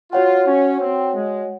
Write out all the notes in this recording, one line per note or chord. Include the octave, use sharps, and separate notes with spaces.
F4 F#4 C#5 F#5
C#4
C4
G#3